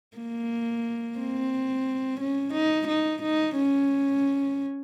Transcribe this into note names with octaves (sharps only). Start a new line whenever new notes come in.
A#3
C4
C#4
D#4
D#4
D#4
C#4